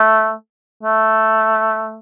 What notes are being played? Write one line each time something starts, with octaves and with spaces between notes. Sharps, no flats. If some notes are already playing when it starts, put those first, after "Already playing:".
Already playing: A3
A3